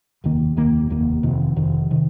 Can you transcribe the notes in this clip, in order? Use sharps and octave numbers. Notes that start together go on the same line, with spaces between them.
F1 D#2 D#3 A#3
F1 D#2 D#3 A#3
F1 D#2 D#3 A#3
F1 F2 C3 D#3
F1 F2 C3 D#3
C3 D#3